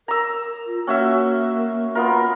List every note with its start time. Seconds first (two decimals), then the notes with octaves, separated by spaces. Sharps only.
0.08 A#4 A#5 E6
0.67 F4
0.87 A#3 C#4 F#4 E5
1.95 B3 F4 A#4